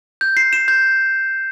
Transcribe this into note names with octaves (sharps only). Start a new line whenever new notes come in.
G6
C7
E7
G6